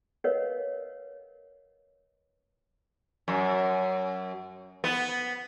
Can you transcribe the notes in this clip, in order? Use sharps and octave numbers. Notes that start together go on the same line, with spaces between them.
A#4 B4 C#5 D#5 F5 F#5
F#2
B3